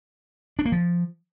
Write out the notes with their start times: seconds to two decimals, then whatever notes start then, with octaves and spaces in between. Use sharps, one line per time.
0.59 D4
0.65 A#3
0.72 F3